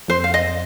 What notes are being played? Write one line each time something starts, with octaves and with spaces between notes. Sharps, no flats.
F2 C5
F5
D#5